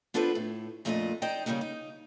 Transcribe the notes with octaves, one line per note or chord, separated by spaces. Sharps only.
B3 D4 F4 A4 B4 C5
A2
F2 A#2 A3 D4 E4 D#5
D#4 C5 D5 D#5 G5
C#3 F#3 G3 A#3 D#4
D#4